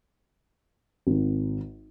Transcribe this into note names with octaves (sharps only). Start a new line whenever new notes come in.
G#1